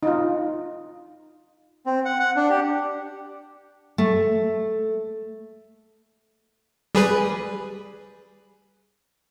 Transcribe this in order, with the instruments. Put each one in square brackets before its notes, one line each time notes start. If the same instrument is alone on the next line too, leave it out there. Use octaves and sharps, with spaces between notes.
[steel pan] D#4 F4
[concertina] C4
F#5
F#5
D4
G4
[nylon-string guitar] A3
[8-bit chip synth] G3 G#4 B4